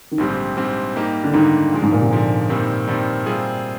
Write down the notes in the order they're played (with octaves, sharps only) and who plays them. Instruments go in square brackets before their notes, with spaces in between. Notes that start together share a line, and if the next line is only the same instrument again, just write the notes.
[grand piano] D#3
[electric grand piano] A#1 G#2 G3 C4 G4 [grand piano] D3
[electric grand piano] A#1 G#2 G3 C4 G4
G#2 G3 A#3 D#4 G4
[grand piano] D3
[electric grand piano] G#2 G3 A#3 D#4 G4 [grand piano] D#3
[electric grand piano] A#2 F3 G#3
[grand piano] G#2
A#2
C3
[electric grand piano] A#2 F3 G#3 [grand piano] D3
[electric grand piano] G2 D#3 G3 C4 [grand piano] A#2
[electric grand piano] G2 D#3 G3 C4
C3 G3 C4 F4 G#4